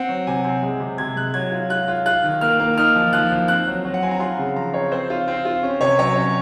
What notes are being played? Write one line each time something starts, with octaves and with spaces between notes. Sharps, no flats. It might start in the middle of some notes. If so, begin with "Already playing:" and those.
Already playing: C4 F#5
F#3
C3 G#5
C4
G#3
C3
C3 G#6
G#3 F#6
F#3 G#6
F4
F4 F#6
F4
F4 F#6
D#3
A#3 F6
A#3
D#4 F6
F3
F3 F#6
F3
C4 F#6
F#3
F#3
F#5
C4 G#5
A#5
F4 C6
C#3
F3 A#5
C4 C#5
C4 C5
F4
C4
F4
C#4
C3 C#5
F#3 C#5
C#4